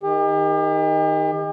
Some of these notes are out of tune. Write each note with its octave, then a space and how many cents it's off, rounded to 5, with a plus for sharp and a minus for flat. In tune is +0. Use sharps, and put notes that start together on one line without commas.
D#3 +0 G4 +40